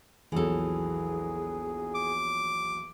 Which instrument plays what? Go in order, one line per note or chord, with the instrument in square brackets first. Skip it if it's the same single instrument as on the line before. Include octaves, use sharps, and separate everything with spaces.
[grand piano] A#1 E2 F#3 [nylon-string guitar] E3 A4 [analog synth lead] G#4
[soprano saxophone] D6